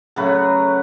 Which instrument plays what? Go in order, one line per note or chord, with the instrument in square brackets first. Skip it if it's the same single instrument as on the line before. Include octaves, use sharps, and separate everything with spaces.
[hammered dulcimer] C#3 F#3 A3 B4